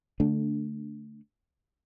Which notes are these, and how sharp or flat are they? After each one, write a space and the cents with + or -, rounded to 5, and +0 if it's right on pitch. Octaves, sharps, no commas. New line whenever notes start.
D3 -20 A3 +0 D4 -5